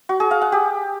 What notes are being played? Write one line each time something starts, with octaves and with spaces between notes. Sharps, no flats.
F#4
G#4
F5
F#5
G4